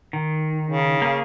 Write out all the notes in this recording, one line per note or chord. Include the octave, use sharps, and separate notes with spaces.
D#3
C#3
A#3 G#4